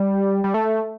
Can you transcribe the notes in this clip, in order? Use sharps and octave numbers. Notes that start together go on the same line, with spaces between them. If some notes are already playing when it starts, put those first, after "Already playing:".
Already playing: G3
G3
A3